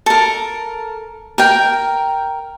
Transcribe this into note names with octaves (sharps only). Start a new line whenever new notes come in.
A4 A#4
A#4 G5